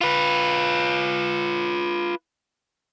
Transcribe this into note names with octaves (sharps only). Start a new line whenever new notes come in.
F4 B4